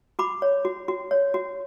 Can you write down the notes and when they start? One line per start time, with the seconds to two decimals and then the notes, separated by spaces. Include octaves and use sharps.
0.19 F#4 B5 D6
0.42 C#5
0.65 F#4
0.88 F#4
1.11 C#5
1.34 F#4